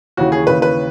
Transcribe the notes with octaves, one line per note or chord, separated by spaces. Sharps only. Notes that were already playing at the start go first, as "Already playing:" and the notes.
D#2 C#3 E3 F#4
G#4
D#2 C#3 E3 B4
B4